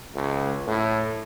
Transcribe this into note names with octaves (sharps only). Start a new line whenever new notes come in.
C#2
A2